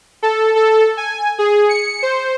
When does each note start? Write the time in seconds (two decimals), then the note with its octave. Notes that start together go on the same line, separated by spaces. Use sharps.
0.23 A4
0.56 A4
0.97 G#5
1.39 G#4
1.69 C#7
2.03 C5